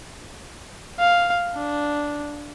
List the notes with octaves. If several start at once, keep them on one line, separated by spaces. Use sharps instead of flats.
F5
D4